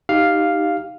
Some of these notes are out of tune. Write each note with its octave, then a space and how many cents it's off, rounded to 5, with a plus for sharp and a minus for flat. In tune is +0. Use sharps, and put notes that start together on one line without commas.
D#4 +0 G4 -5 F5 +0